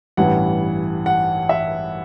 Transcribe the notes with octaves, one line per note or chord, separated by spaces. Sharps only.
A1 G2 E3 F#5
F#5
E5